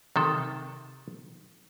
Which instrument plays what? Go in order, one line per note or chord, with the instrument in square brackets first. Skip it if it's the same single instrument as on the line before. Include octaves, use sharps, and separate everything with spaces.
[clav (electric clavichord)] C3 D#3 A4